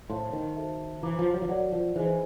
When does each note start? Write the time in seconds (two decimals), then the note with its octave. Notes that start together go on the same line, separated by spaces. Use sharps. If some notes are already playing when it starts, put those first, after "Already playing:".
0.09 A2 C5 F5 A5 C6
0.33 D#3
0.56 F#4 A4 C5 E5 A5
1.02 E3 C5 F5 A#5 D6
1.19 F3
1.34 F#3
1.42 F3
1.49 F#3 A#4 D5 F#5
1.72 F3
1.96 E3 D#4 G#4 C5 D#5 G#5